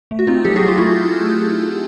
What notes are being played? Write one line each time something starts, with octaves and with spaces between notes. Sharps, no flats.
A3
F#4
C4 D#4 F4
F#3 G4 A4
F#4 G#4
F#3
F4 G4
A3 E4 F#4